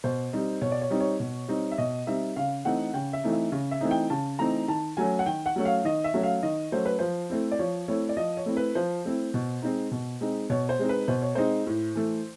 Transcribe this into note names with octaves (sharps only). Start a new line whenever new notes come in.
B2 C5
G3 C4 D#4
B2 C#5
D5
C#5
G3 C4 D#4
C#5
B2
G3 C4 D#4
E5
B2 D#5
G3 C4 D#4 E5
C#3 F5
E3 A3 C4 D#4 F#5
C#3 G5
E5
E3 A3 C4 D#4
E5
C#3
E5
E3 A3 C4 D#4
G5
C#3 A5
E3 A3 C4 D#4 A#5
D#3 A5
F#3 A3 C#4 G#5
F#5
D#3 G5
F#5
F#3 A3 C#4
F5
D#3 D#5
E5
F#3 A3 C#4
F5
D#3 D#5
F#3 A3 C#4 C5
B4
F3 C5
A3 C4 E4
D5
F3 C#5
A3 C4 E4 C#5
D5
F3 D#5
C#5
A3 C4 E4
B4
F3 C5
A3 C4 E4
B2
G#3 C4 D#4
B2
G#3 C4 D#4
B2 C#5
C5
G#3 C4 D#4
B4
B2 C5
C#5
G#3 C4 D#4 C5
A2
E3 A3